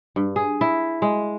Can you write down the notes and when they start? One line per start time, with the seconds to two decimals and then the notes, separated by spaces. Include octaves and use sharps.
0.16 G2
0.36 G#4
0.61 E4
1.02 G#3